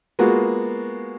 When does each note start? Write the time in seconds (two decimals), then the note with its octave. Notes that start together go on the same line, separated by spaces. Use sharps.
0.19 G#3 A#3 B3 F4 F#4